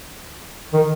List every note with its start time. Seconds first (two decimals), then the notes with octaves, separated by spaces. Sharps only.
0.74 D#3